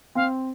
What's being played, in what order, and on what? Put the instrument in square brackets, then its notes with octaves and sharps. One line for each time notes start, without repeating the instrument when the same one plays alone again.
[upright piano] C4 [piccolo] F5